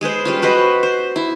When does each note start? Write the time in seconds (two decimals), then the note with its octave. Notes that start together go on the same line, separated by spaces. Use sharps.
0.01 G#3 G#4 B4 C5
0.25 G3 C#4 F4
0.42 F#4 B4 C5 D#5
0.83 C5
1.16 E4